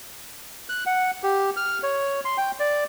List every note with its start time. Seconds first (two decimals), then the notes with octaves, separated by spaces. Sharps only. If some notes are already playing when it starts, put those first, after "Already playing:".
0.69 F#6
0.86 F#5
1.23 G4
1.57 F6
1.83 C#5
2.25 C6
2.38 G5
2.60 D5